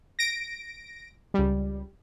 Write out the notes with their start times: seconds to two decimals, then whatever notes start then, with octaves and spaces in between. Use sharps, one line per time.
0.19 A#6 D7
1.34 C#2 G3